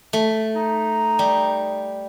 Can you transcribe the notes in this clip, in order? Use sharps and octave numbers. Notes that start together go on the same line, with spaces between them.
A3
D#4
G3